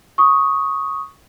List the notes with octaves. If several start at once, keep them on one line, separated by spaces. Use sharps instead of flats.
C#6 D#6